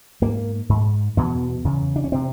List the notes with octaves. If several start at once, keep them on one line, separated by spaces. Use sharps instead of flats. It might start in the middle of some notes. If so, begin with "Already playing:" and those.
G#2 A#3
G#2
E2 B2 B3
E2 C#3
D4
C#4
C3 C4